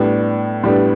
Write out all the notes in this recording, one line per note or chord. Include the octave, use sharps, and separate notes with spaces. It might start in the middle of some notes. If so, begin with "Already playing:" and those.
Already playing: A2 G3 B3 D4
A2 G3 B3 D4